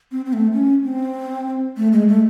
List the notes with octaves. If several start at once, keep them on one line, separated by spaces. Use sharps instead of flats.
C4
C4
A3
C#4
C4
A3
G#3
A3